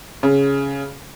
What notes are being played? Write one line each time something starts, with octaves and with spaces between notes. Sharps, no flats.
C#3